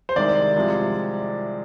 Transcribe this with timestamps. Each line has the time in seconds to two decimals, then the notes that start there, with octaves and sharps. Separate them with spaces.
0.09 C5
0.16 C2 C3 D#3 G#3 D5
0.56 C2 C3 F3 G#3